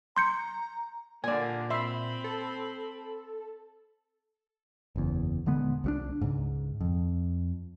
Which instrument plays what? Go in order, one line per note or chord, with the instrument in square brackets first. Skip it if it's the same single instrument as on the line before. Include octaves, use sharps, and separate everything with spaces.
[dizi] A#5 [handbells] C6 G6 C#7
[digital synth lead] A#2 [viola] D3 A#3 [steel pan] D5 G#5
[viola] C4 B5 [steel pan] E5 C6
[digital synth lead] A4
[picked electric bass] F#1 E2
D#1 D3 G#3 B3
C2 F#3 D4
C#2 G#2
F2